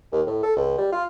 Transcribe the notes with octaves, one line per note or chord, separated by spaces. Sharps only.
D#2
A2
A4
C#2
G3
F4